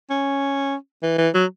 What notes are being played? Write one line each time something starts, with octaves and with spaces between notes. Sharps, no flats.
C#4
E3
E3
F#3